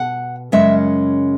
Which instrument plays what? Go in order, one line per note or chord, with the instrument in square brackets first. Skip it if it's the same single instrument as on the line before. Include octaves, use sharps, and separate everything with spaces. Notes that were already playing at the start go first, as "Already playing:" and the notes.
Already playing: [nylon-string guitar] B2 F#5
F#2 C#3 G#3 C#4 E5